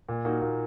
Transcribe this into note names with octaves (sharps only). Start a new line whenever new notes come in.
A#2
A#3 D#4 F#4
A#2